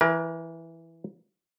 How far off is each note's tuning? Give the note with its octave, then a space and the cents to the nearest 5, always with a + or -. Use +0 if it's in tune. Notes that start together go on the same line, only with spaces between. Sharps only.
E3 +0 A#4 +30